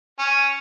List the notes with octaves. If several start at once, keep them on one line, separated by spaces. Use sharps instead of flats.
C#4